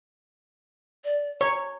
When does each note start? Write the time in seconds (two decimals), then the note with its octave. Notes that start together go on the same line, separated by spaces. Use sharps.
1.04 D5
1.41 C#5 A#5